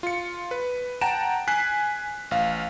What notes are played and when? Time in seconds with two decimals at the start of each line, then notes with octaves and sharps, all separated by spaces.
0.03 F4 C#7
0.51 B4
1.01 F#5 G5 A5 A#5 D7 E7
1.48 G#5 F#6 B6 C7
2.31 A1 F5